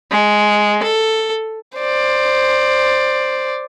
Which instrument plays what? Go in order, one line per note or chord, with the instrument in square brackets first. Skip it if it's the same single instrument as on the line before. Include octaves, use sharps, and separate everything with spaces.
[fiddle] G#3
A4
[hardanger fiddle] C5 D5